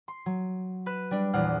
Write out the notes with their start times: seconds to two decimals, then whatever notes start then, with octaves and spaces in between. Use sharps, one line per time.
0.08 C6
0.26 F#3
0.86 B4 F#6 E7
1.11 G3 D4
1.33 A#1 E2 F#5 F6 C7